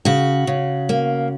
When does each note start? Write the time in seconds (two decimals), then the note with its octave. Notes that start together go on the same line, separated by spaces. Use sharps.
0.05 C#3 F#4
0.47 C#3
0.89 A#3